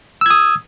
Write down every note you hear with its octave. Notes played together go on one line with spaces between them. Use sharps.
D#6 E6 G#6